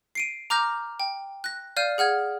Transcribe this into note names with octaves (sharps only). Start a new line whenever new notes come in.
C7 D7 D#7
A#5 D6 F6 G6 A#6
G5
F#6 A#6
D5 F5 F6 G6 D#7
G#4 F#5 F6 G#6